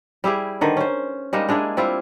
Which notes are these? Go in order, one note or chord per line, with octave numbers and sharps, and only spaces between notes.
G3 E4 G4 G#4
D3 D#3 B4 C5
C#4 C5
G3 G#3 A#3 D#4
G#3 D4 E4 G#4
G3 C4 E4 F4